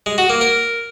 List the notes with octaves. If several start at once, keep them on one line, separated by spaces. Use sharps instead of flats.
G#3
F#4
A#3
A#4